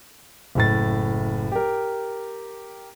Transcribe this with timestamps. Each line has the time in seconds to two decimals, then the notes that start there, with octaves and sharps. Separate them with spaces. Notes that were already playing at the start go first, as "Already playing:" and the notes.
0.55 F#1 A2 A6
1.52 G4 A#4